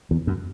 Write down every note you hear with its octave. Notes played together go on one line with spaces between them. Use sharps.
E2
F#2